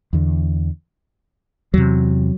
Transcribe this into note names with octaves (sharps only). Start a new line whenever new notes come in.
E2 D3
E2 C3 F#3